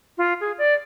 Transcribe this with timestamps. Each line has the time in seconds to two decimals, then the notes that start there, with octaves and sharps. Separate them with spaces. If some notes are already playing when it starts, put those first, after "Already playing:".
0.18 F4
0.41 G#4
0.58 D5